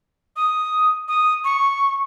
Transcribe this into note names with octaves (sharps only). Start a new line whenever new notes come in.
D#6
D#6
C#6